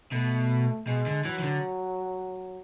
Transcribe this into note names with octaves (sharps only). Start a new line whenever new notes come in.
B2 A3
B2 G#3
D3
E3 F#3
E3
D3